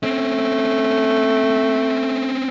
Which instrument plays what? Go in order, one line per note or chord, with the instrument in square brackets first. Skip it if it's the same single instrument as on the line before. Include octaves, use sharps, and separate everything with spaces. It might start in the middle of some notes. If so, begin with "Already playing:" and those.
[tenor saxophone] A3 [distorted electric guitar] C4 C#4